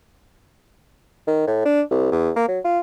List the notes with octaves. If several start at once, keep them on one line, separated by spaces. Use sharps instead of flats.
D#3
A2
D4
C2
E2
A#3
F#3
F4